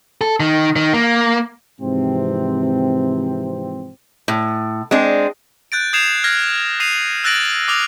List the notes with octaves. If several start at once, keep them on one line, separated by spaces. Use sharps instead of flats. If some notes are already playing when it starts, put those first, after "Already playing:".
A4
D#3
D#3
A#3
G#2 C3 E3 F3 C4
A2
G#3 C4 D4
F#6 G6 A6 D7
D#6 G6 G#6 C7 E7 F7
F6 G#6 A#6
D#6 C7 D#7 F7
E6 F#6 A6 A#6 D7 F#7
D6 D#6 F6 F7